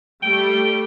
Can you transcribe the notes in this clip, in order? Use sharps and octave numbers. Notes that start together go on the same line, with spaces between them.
G3 A3 G4 G5